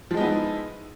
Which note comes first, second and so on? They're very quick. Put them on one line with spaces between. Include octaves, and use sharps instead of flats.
F3 G#3 D#4 B3 E4